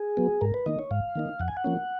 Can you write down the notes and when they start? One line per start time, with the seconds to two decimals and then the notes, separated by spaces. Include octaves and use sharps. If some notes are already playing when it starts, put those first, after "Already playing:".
Already playing: G#4
0.17 F#3 B3
0.41 G#2 A#4
0.54 B4
0.66 D#3 A#3 D#4 D#5
0.79 C#5
0.91 G#2 F5
1.15 D#3 A#3 D#4
1.40 F2 F#5
1.48 G#5
1.57 F#5
1.64 F3 A#3 C#4